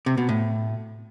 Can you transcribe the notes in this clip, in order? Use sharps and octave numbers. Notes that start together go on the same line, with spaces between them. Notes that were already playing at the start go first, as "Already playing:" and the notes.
C3
B2
A2